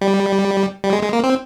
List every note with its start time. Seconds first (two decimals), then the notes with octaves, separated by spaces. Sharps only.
0.01 G3
0.84 G3
0.93 G#3
1.03 G#3
1.13 A#3
1.23 C4